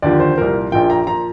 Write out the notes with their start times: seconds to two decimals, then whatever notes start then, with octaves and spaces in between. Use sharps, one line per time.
0.02 D#2 D3 F3 D5
0.20 C5
0.38 C2 A#2 F3 A#4
0.72 A#1 A#2 F3 G5
0.90 A#5
1.07 A#2 F3 A#5